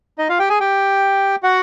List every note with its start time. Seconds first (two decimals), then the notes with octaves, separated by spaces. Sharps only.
0.18 D#4 D#5
0.29 F4 F5
0.39 G4 G5
0.49 G#4 G#5
0.60 G4 G5
1.43 F#4 F#5